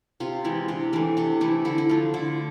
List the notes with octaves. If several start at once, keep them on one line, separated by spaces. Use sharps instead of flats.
C3 F4
E3 G#3 E4
C3 D4
E3 A3 D4
C3 D4
E3 A3 E4
D3 E4
E4
F3 A3 F4
D3 E4